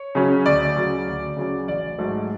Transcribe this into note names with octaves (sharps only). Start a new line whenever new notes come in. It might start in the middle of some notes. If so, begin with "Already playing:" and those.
Already playing: C#5
C#3 F#3 C#4
D2 D5
C#3 F#3 C#4
D2
C#3 F#3 C#4
A1 D5
G#2 F#3 A3